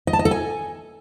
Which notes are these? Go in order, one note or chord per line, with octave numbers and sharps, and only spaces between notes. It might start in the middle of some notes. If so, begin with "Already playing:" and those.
D#5
A5
D#5
A4
G#5